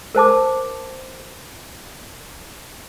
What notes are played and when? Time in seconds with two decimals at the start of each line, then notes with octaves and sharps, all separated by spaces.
0.15 A#4 C5 A5 D6